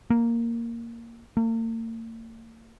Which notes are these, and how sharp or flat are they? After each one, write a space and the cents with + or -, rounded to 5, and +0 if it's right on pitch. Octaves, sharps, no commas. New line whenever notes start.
A#3 -5
A#3 -45